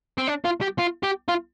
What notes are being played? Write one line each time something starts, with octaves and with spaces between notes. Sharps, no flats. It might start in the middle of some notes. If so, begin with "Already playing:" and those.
C4
D4
F4
G4
F4
G4
F4